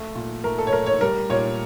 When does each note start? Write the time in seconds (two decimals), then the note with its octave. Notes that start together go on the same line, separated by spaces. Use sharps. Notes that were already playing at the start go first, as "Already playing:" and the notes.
Already playing: A3
0.15 A#2
0.44 A3 A#4
0.58 A4
0.67 C#5
0.73 A3 A#4
0.86 C#5
1.01 G3 A#4
1.30 A#2 C#5